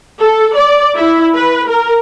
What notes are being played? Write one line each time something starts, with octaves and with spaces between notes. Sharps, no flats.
A4
D5
E4
B4
A#4